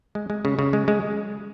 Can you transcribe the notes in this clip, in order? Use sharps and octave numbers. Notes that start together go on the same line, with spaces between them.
G#3
G#3
C#3
C#3
G#3
G#3